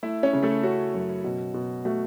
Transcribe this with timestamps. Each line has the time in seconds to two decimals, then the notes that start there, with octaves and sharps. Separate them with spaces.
0.03 A3 E4 E5
0.23 C#4 C#5
0.33 C#3
0.43 A3 A4
0.63 C#4 F#4
0.94 F#2
1.24 B2
1.54 B2
1.85 A3 F#4